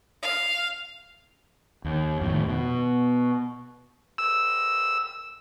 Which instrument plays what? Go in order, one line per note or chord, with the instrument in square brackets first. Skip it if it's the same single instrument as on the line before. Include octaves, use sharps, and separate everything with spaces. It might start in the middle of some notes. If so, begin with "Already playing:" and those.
[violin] F5
[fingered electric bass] D#2
F2 A2 D#3
B2
[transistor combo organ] E6